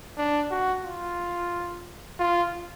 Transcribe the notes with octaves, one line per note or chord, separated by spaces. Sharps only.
D4
F#4
F4
F4